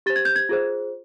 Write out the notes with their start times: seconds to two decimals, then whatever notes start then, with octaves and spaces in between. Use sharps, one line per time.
0.06 G4 C5 A6
0.16 G#6
0.25 G6
0.36 G#6
0.49 F4 G#4 C5